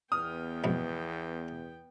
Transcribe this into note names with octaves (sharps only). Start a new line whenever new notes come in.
E2 B3 G5 D#6 F6
B1 F2 G#2